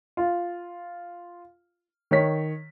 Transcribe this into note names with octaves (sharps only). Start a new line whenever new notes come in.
F4
D#3 C#5 B6